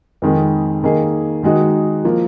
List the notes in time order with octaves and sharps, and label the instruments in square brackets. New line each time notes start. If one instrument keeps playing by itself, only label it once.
[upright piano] F2 D#3 G#3
D#3 A#3 D#4 G#4
D#3 G#3 D#4 F#4
F3 A#3